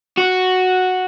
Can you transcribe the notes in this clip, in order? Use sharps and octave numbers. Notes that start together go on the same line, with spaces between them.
F#4